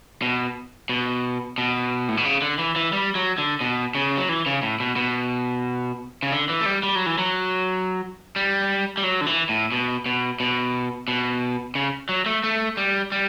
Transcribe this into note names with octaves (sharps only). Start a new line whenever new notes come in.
B2
B2
B2
A2
B2
C#3
D3
E3
E3
G3
F#3
D3
B2
C#3
F#3
E3
C#3
A2
B2
B2
C#3
D3
E3
A3
G3
G3
F#3
E3
F#3
G3
G3
F#3
D3
E3
A2
B2
B2
B2
B2
C#3
F#3
A3
A3
G3
G3